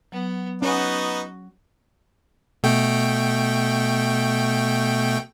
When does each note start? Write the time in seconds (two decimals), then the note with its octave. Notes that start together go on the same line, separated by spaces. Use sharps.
0.12 F#3 B3
0.62 B3 C#4 D#4 F#4
2.63 B2 A3 G5